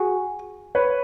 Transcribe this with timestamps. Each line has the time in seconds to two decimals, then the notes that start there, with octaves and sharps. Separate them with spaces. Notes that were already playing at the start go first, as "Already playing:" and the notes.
Already playing: F#4 G#4
0.75 B4 C#5